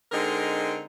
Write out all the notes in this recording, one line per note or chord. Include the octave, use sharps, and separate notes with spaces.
D3 G#3 C4 D#4 A#4